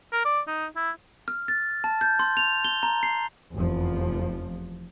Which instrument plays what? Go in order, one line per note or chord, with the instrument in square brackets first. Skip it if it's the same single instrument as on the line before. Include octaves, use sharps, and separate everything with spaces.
[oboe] A#4
D5
D#4
E4
[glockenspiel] F6
A6
A5
G6
C6
F7
G7
A#5
C7
[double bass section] F1 E2 F3